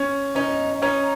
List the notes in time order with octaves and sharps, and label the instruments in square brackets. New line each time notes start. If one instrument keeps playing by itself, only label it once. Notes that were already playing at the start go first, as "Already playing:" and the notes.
Already playing: [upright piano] C#4
[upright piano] C#4 [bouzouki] D#4
[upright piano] C#4 [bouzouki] D#4